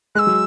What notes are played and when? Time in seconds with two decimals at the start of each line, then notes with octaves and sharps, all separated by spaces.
0.15 G#3 E6 F#6
0.27 F#3